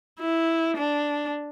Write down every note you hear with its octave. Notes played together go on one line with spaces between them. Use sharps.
E4
D4